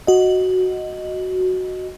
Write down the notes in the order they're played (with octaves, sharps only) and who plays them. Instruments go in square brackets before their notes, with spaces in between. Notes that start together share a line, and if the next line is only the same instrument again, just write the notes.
[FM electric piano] F#4 D#5